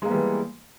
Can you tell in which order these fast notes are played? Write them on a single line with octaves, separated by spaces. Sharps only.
G#3 A#3 B3 G3 E3